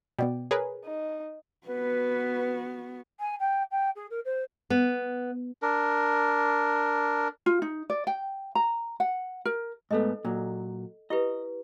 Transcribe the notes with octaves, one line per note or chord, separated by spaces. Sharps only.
B2 B3 D5 G5
G#4 A#4 B4 C#5
D#4
B3 F#4 B4
G#5
G5
G5
G#4
A#4
C5
B3
D4 A#4
F4
D#4
D5
G5
A#5
F#5
A#4
G#2 A3 B3 A4 D#5
A#2 F#3
E4 G4 B4 D#5